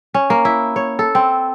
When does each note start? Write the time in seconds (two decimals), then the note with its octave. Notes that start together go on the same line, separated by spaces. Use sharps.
0.14 C#4
0.30 A#3
0.45 E4
0.76 C#5
0.99 A4
1.15 C4